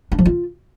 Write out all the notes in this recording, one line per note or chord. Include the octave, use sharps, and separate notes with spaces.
D4
F3
F4